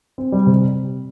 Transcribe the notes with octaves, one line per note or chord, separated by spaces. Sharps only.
C4
G3
C3